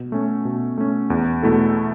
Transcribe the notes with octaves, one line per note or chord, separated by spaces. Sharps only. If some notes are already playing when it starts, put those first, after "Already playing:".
Already playing: B2
A3 C#4
B2
A3 C#4
E2
B2 A3 E4 A4